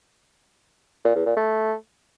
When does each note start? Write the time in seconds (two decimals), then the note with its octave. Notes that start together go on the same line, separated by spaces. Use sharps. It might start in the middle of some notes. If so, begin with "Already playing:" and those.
1.05 A#2
1.15 E2
1.26 A#2
1.36 A3